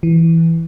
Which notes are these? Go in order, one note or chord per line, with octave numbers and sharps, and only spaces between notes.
E3